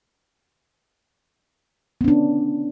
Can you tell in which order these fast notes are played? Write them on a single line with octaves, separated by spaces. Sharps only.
B3 C#4 D4